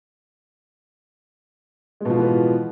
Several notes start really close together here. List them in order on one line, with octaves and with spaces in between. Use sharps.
G#3 B2 F3 E3 B3